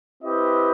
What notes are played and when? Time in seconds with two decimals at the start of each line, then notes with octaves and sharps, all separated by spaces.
0.23 C4 E4 G4 B4 D#5